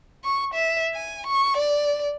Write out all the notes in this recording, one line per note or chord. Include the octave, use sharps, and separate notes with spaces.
C#6
E5
G#5
C#6
D5